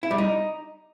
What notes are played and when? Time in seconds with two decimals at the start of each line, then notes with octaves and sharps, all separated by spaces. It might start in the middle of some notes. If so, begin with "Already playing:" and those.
0.03 E4
0.11 G3
0.18 D#4